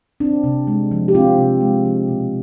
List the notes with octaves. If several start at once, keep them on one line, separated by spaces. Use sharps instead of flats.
C4 D4
C3
G#3
F3
G4
C4 F4
C3
G#3
F3
B2